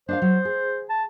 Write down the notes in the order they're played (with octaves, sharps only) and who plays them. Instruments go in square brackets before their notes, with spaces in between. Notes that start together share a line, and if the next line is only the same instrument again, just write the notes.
[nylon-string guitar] D4 D#5 F5 [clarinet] C5
[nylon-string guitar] F#3
G#4
[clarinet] A5